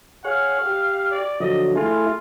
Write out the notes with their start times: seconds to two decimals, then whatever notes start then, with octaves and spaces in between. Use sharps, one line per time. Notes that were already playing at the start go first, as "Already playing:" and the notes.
0.25 G#4 C#5 F5 F#5
0.66 G4
1.11 D5
1.40 D3 F3 F#3 D#5
1.75 A3 E4 F4 G#4